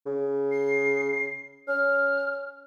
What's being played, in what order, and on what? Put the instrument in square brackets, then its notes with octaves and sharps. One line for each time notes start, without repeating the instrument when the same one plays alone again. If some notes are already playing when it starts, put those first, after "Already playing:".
[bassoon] C#3
[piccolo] C7
[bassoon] C#4 [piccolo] F6